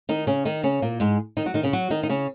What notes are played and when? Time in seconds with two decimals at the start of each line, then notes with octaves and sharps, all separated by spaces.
0.09 D#3 D#4
0.27 C#3 C#4
0.45 D#3 D#4
0.63 C#3 C#4
0.82 A#2 A#3
1.00 G#2 G#3
1.37 D#3 D#4
1.46 F#3 F#4
1.54 D#3 D#4
1.63 C#3 C#4
1.73 F#3 F#4
1.90 D#3 D#4
2.03 D#4
2.09 C#3 C#4